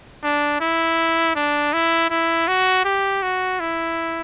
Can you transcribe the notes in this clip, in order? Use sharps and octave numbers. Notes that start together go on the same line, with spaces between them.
D4
E4
D4
E4
E4
F#4
G4
F#4
E4